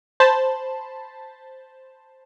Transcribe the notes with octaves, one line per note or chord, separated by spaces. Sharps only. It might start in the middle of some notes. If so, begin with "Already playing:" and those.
C5 A5 B5